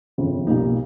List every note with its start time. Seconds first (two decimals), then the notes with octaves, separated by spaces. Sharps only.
0.18 G1 F2 C#3 F3
0.47 B1 A#2 G3 A#3 D#4